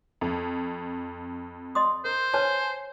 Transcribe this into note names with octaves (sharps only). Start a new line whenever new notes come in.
F2
D#5 C6 D#6
A#4 C5
B4 C#5 G#5 A5